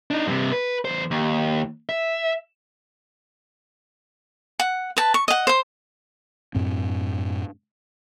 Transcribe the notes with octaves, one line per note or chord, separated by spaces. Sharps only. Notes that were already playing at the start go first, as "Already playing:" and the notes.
D4 D#4
G2 C3
B4
E2 C5
D#2
E5
F#5
B4 A5
C#6
D#5 F#5
C5 C6
F#2 A2 C4